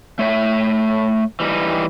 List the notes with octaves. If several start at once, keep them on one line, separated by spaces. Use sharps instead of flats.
A3 C#5 E5
E3 G3 D#4